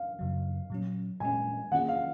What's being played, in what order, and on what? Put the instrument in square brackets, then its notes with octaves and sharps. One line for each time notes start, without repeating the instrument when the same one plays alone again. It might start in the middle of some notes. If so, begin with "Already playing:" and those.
Already playing: [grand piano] F5
[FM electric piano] F#2 C#3 F#3
A#2 F#3 C#4
[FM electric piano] A#2 G#3 C#4 [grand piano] G#5
[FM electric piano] D#3 A#3 C#4 F4 G#4 [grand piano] F#5
[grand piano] F5